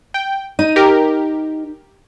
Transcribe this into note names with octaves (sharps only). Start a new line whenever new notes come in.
G5
D#4 D#7
G4 A#4